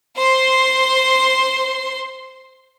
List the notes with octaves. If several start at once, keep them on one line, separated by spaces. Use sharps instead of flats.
C5 C6